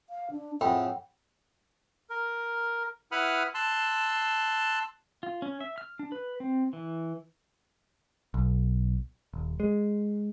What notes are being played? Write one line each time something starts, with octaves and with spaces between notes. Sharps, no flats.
F5
D4
F2 A2 G#4 F#5 G5 B5
A#4
E4 B4 F#5 B5 D#6 F6
A5 C6 E6 F#6
F4
C#4
E5
F6
D4
B4
C4
E3
B1
D#1
G#3